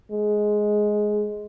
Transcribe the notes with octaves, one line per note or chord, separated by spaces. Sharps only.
G#3